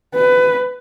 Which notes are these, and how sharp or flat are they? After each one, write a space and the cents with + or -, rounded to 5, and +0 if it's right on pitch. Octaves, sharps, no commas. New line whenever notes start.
B4 +20